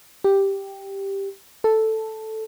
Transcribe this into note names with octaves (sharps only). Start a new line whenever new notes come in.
G4
A4